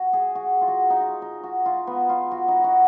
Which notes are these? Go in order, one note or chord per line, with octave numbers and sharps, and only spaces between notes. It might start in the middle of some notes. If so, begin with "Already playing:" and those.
Already playing: F#4
G#4
F#4
F4
F#4
D#4
F4
D#4
F#4
F4
B3
F4
F#4
D#4
F#4